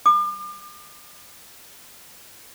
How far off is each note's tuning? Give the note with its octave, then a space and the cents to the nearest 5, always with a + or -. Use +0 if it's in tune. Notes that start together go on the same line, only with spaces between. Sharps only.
D6 +40